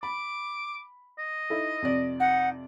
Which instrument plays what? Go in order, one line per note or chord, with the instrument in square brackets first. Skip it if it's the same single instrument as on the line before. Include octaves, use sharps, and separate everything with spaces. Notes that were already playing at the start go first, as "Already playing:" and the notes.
[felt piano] B5 [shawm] D6
[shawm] D#5
[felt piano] D#4 E4 A4
F2 C3 D5
[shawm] D#4 [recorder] F#5